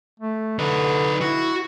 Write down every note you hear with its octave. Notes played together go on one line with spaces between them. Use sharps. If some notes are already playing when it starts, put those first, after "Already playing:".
A3
D3 D#4 B4
E4 F#4